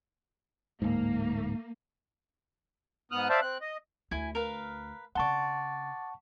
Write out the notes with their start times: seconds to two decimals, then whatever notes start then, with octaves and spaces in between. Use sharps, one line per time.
0.82 D1 G#2 A#3
3.12 G#2 B3 D#6 F6 F#6
3.30 C5 D5 E5 F5 A5
3.42 C4 F#6
3.61 D#5
4.11 D2 E4 G#5
4.35 A#4 B4 F5
5.15 C#3 C4 D5 F#5 A5 C6 C#6